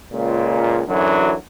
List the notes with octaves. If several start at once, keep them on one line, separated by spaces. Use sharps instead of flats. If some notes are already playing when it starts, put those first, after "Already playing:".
C#2 A#2
F#2 D3 E3 F#3